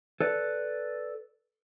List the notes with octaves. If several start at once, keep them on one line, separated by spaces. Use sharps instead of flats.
A4 B4 D5